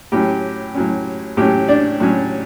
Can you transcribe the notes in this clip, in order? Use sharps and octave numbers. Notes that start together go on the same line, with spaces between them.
A2 F#3 C#4 G4
A2 F#3 C#4
A2 F#3 C#4 G4
D4 D5
A2 F#3 C#4